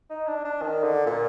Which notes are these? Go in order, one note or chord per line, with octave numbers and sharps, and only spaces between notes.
D#4
D4
D4
D#3
D3
A#2